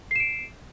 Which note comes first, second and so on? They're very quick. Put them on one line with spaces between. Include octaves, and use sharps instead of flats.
C7 E7 D7